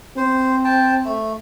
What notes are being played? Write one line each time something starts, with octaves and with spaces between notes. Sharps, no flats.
C4 C5
G5 A5
A3